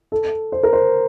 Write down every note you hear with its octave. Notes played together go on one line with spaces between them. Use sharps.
A4
C5
A#4
C5